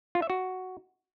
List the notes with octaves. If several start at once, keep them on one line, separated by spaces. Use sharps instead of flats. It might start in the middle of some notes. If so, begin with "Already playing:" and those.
F4
E5
F#4